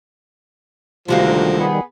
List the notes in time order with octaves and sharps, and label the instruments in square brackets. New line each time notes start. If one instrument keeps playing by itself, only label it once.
[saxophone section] D2 [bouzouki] C3 G#3 A#3 [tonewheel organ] D#3 G3 [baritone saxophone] F3
[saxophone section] B3 G#4